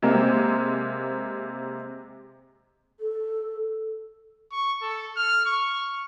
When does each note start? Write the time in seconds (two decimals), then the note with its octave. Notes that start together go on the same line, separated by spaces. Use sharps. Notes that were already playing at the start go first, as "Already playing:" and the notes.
0.02 C3 G#3 A#3 C4
3.00 A4
4.52 C#6
4.82 A4
5.16 F6
5.45 C#6